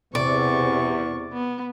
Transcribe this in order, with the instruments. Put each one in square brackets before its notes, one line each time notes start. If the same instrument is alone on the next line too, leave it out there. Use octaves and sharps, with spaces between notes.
[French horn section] E2 [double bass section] C3 [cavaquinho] D5 [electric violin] C#6
[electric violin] B3